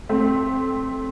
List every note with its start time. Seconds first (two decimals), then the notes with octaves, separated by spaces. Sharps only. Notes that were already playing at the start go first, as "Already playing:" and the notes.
0.09 A3 C4